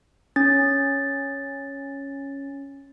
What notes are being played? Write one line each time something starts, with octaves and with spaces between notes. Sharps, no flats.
C#4 A6